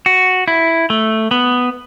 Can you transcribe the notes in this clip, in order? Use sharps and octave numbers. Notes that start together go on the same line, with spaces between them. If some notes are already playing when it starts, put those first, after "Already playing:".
F#4
E4
A3
B3